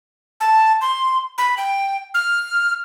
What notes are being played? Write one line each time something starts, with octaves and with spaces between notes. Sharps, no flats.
A5
C6
B5
G5
F6